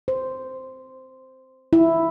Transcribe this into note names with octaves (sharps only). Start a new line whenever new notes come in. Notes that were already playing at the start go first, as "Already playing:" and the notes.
C5
E4